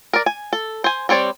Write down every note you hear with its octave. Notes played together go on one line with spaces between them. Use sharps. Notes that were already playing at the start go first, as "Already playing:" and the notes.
A#4 D5
G#5
A4
C5 G#5
G3 C4 C#5 D5